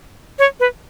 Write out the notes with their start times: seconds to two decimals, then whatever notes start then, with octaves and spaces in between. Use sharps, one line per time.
0.39 C#5
0.60 B4